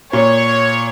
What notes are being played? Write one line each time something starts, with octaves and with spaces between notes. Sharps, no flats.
A#2 C#5